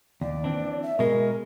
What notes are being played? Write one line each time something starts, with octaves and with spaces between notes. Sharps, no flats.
D#2 D5
E3 C4 D4
E5
B2 G#3 A#4